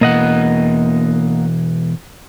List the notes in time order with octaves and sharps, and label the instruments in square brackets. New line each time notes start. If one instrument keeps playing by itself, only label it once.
[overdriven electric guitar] B2 E3 [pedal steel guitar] A#3 D#5 F#5